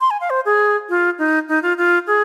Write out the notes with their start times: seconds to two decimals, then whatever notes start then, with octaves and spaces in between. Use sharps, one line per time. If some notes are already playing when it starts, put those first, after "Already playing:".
0.01 C6
0.11 G#5
0.21 F5
0.30 C5
0.46 G#4
0.89 F4
1.19 D#4
1.49 D#4
1.63 F4
1.78 F4
2.07 G#4